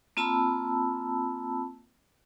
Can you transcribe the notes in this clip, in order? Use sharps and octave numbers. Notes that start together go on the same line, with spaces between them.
A#3 C4 F4 A5 B5 E6